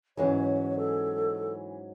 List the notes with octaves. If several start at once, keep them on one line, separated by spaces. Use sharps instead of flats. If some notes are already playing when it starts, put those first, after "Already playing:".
G#2 E3 F#3 G#3 C#4 C#5
A4